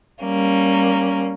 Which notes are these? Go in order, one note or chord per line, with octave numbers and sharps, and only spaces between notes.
G3 A#3 C#4